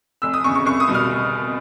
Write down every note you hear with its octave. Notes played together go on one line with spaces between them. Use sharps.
F1 E6
D#6
E2 C#3 C#6
C#6
C2 C#6
D#6
B2 G3
F6